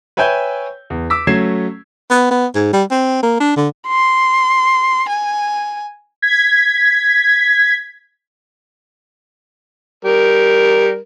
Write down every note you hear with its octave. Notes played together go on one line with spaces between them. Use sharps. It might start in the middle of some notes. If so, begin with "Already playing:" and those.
B4 C#5 E5 G5 G#5 G6
E2
D6 E6 B6
F#3 A3 C#4 G#6 C7 E7
B3
B3
G#2
G3
C4
A#3
D4
D3
C6
G#5
G#6 B6
G3 A#4